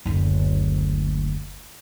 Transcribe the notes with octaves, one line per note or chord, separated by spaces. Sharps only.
F#1 D2